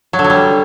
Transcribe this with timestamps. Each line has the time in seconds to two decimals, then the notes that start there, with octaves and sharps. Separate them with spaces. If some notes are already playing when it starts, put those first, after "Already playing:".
0.13 F#3
0.19 D3
0.24 F#3
0.30 G3